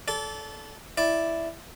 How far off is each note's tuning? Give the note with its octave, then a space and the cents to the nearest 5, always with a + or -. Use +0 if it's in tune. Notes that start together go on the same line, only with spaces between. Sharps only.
A4 -15 D5 -30
E4 +0 D5 +0